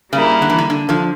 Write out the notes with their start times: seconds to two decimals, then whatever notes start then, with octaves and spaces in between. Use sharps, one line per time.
0.13 C#3 G3 A#3 E4 A#4
0.42 D3
0.50 E3
0.58 D3
0.70 D3
0.89 D3 F3